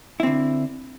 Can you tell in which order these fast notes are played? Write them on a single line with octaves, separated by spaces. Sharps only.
E4 C4 D3